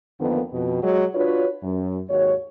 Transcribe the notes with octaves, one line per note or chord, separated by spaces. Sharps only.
F2 D3 D#3 A#3 B3
F2 B2
F#3 G#3
D4 F4 F#4 B4 C#5
F#2
D#2 G#2 F#4 C#5